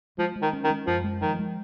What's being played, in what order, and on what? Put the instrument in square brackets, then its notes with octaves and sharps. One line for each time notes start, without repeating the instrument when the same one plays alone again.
[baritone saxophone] F3 [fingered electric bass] G#3
[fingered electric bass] G#3
[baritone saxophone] D#3
[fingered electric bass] C#4
[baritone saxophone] D#3
[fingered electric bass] G#3
[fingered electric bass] F#2 [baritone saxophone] F3
[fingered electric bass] G#3
[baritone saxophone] D#3 [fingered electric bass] F3
[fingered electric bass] G#3